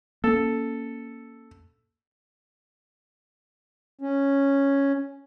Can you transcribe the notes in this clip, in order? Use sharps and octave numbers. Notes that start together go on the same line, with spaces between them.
A#3 C#4 A4
C#4